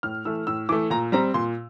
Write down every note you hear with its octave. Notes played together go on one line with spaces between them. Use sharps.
A2 F6
E3 A3 E6
A2 E6
E3 A3 D6
A#2 A#5
G3 C4 A#5
A#2 C6